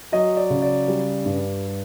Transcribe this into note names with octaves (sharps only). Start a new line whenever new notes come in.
F#3 D#5
D5
C#3
D5
G3
G2